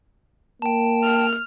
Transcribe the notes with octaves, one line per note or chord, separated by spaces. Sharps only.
A#3 G5 A5
F6